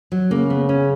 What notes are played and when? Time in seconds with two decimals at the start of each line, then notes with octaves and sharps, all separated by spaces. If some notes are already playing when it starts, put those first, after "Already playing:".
0.12 F#3
0.31 C#3 A#3
0.50 B3
0.69 C#4